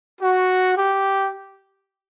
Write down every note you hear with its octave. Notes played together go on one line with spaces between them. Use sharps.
F#4
G4